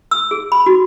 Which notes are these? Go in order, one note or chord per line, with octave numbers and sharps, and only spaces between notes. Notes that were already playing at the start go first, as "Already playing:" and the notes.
E6
G#4
B5
F#4